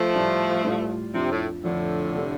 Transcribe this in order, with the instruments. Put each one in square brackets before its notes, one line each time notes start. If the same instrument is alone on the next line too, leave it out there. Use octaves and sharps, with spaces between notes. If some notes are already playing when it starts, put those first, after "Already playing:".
Already playing: [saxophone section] F3 A3
[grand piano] A2 G3 F4 D5
A2 G3 F4 D5
[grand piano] F2 F3 D4 [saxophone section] C3
[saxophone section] A2
[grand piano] F2 F3 D4 [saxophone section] A2 D3
[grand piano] C3 A3 D4 A4